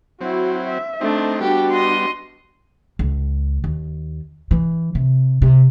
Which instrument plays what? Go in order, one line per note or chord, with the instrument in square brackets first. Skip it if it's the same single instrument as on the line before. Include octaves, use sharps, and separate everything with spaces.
[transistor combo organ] F#3 C4 [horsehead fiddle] E4 F#4
[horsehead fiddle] E5
[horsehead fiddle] A3 [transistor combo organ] C4 D#4 [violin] D4
[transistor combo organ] G3 B3 [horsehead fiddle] D4 F#4 [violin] G4
[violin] D#5 C6
[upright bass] C#2
D#2
E3
C3
C3